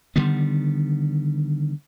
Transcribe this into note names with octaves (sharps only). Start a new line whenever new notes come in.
D3 D#3 G3 B3